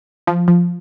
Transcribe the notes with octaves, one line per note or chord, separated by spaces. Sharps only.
F3
F3